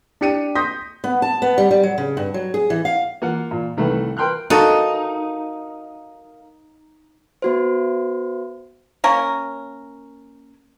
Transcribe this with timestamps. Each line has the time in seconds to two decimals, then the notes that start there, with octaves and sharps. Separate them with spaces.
0.21 D4 G4 C#7 D#7
0.55 C6 D#6 G6 A#6 B6
1.04 B3
1.22 A5
1.42 B3
1.58 G3
1.71 G3
1.83 F#3
1.98 C#3
2.17 G2
2.34 F#3
2.54 G#4
2.70 E3
2.85 F5
3.22 A#3 F4 F#5
3.51 A#2
3.77 C2 D#3 A3 B4
4.17 A#4 B4 G5 C6 F6 F#6
4.50 D#4 F#4 A4 A#4 D#5 F5
7.42 B3 F#4 C5
9.04 A#3 C#4 A#4